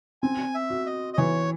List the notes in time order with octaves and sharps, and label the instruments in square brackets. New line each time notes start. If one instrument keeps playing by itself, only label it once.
[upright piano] C4 [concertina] G#5
[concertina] E5
[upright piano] F#4
[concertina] D#5
D#5
[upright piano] E3 [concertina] C#5